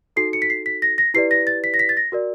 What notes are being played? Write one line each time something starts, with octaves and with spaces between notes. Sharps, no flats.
D#4 F#4 A4 C7
C#7
B6
C7
B6
A#6
A#6
E4 G4 B4 D5 C7
A#6
A6
B6
A#6
B6
A6
A#6
F#4 A#4 D5